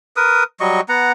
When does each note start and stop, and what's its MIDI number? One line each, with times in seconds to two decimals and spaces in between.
0.17 0.44 70
0.17 0.44 71
0.17 0.44 87
0.60 0.81 54
0.60 0.81 55
0.60 0.81 75
0.60 0.81 85
0.89 1.12 59
0.89 1.12 78
0.89 1.12 82